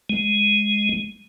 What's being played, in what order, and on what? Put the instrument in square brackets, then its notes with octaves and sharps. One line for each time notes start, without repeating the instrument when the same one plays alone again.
[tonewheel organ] G#3